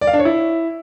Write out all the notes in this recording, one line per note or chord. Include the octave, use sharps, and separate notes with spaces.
D5
F5
D4
C#5
E4